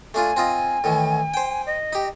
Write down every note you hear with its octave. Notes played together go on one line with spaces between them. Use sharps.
A3 D4 F4 G#5
C4 F4 D#5
A2 D#3 E3
C5 G5
D#5
D#4 G4